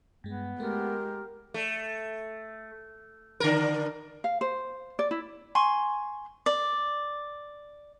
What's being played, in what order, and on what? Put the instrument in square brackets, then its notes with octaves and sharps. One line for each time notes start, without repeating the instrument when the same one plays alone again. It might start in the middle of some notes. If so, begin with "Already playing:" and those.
[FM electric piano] G2 G#3 [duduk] B3
[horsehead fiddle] G#3 G4 [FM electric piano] A3 [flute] A#4
[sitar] A3
D3 A#4
[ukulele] F5
C5
D5
E4
[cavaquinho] G#5 C6 C#6
D5